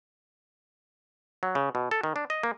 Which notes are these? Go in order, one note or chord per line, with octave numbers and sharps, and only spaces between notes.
F#3
C#3
B2
A4
D#3
D4
D#5
A#3